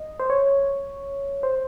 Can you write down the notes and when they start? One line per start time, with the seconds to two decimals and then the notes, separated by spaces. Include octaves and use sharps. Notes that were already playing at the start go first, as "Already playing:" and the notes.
Already playing: D#5
0.20 C5
0.30 C#5
1.43 C5